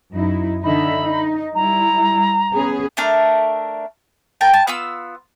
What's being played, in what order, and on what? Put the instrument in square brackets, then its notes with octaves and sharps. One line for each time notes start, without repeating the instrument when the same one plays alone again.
[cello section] F#2 D#4 E4
[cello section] D3 D#4 E5 [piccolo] B5
[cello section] D#4
[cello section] G3 E4 [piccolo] A#5
[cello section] B3 C#4 G#4
[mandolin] A3 D4 A#4
A#4 G5 A5
A5
B3 F4 E6